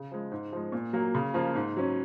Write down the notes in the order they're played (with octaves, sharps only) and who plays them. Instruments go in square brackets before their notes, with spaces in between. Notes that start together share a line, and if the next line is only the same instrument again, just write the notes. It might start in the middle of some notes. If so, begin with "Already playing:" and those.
Already playing: [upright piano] C#3
F3 G#3
G#2
F3 G#3
A#2
F#3 A#3
C#3
F3 A#3 F4
G#2
F#3 C#4